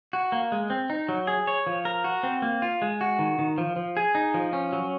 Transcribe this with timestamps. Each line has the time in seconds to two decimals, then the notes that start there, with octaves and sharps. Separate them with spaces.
0.13 F#4
0.32 A#3
0.52 G#3
0.70 C4
0.90 D#4
1.09 F#3
1.27 G#4
1.47 C#5
1.67 F3
1.85 A#4
2.04 F#4
2.23 C4
2.42 A#3
2.62 F4
2.82 G#3
3.01 F#4
3.19 D#3
3.39 D#3
3.58 F3
3.76 F3
3.97 G#4
4.15 D#4
4.34 F3
4.53 C#4
4.73 F#3